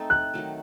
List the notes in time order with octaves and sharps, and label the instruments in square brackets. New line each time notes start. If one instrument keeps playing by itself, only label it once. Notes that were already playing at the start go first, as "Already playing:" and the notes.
Already playing: [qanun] A3 C4 D#4 A4
[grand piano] F#6
[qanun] D#3 F#3 A3